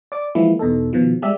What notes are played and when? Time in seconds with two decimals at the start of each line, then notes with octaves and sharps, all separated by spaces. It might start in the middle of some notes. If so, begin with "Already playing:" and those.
0.12 D5 D6
0.35 E3 F3 G#3 A#3 E4
0.59 E2 B2 D#4 A4
0.93 B2 D#3 F3
1.22 G3 G#3 G4 D5 E5